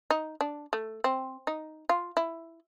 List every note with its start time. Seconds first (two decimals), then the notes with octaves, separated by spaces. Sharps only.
0.10 D#4
0.41 D4
0.73 A3
1.04 C4
1.47 D#4
1.89 F4
2.17 E4